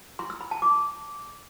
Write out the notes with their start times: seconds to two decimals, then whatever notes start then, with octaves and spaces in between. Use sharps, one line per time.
0.19 C6
0.30 E6
0.41 B5
0.51 A5
0.62 D6